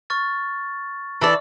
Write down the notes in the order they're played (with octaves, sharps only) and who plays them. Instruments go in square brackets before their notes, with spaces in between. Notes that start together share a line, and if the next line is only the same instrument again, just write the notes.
[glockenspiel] C#6 F6 A6
[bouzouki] E3 A4 D5